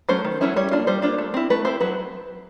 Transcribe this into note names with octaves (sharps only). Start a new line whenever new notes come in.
F#3 A3 C#4 C5
D#3
F#3 A3 C#4 E4
G3 C#5
A#3 D4 F4
G3 C5
A#3 D4 F4
A3
C4 E4
A3 B4
C4 E4 C5
F#3 B4